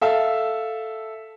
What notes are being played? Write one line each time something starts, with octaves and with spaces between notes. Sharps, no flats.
A4 E5 F5 E6